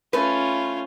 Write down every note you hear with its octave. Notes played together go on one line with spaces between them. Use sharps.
A3 C#4 F4 B4